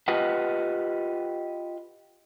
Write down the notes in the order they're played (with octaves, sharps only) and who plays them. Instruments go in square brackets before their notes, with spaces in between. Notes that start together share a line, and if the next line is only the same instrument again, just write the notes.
[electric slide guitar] F4 G4 B4 D#5 F#5